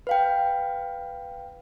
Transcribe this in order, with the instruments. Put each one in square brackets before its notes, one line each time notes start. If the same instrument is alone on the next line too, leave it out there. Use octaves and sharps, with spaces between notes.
[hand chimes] B4 F5 G5